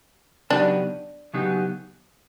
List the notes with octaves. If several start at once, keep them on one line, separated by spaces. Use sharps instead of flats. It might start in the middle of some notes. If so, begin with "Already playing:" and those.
C#3 F#3 B3 D4 D#4 G4
C#3 F#3 B3 D#4 G4